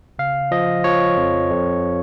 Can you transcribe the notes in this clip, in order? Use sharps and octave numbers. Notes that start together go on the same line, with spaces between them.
C#3 F5
F3 D#5
F3 C#5
F2
F2